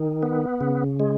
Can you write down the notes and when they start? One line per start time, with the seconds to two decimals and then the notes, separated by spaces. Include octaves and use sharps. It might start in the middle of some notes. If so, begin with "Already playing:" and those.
Already playing: D#3
0.23 B3
0.61 C#3
1.00 G#3